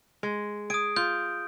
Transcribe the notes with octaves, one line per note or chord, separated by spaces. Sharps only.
G#3
G#4 D#6 D7
F4 G6